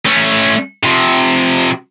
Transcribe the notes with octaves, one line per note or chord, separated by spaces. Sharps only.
A3 C#4
C3 F3